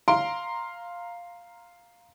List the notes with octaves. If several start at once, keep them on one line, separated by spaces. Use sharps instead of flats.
F5 A#5 C6 D7